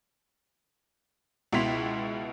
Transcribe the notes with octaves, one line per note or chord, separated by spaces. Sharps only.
C#2 B2 E4 C6 B6 F7